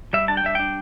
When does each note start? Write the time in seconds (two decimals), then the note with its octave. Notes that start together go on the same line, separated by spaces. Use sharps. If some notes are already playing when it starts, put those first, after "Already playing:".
0.13 G3 E5
0.28 D4 A5
0.37 G5
0.44 G3 E5
0.55 D4 G5